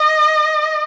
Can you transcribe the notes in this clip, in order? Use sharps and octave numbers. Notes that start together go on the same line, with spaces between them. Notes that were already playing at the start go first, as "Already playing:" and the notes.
Already playing: D#5